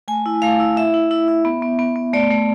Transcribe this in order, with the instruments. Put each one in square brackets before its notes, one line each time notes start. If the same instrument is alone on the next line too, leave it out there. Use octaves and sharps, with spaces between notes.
[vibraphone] A3 G#5
E4
A3 F5
E4
E4 E5
E4
E4
E4
B3
B3
B3
B3
A3 D5
A3